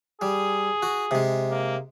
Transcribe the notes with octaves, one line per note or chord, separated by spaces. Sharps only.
G3 G#4
F#4
C3 G#3
A#3